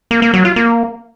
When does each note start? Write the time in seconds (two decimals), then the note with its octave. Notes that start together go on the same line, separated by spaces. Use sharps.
0.11 A#3
0.22 A#3
0.34 F#3
0.45 F4
0.56 A#3